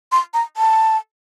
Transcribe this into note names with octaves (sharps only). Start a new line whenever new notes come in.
C6
A#5
A5